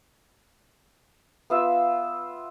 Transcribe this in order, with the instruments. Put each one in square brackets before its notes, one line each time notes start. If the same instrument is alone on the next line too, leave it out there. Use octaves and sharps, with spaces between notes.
[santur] B3 F4 E5